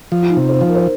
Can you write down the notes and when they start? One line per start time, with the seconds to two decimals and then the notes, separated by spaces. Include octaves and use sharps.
0.12 F3
0.22 F4
0.30 D#4
0.37 C3
0.49 C5
0.61 F3
0.68 A#4
0.75 C5